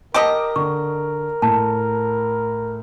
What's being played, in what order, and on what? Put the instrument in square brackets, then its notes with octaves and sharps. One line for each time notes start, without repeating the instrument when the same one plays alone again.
[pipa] G4 A4 D#5 [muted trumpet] A#4 [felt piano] D6
[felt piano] D3 [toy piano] C#6
[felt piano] A2 [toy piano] A5